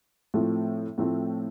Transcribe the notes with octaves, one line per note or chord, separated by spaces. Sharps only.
A2 F3 A3 C4
A2 F3 A3 C4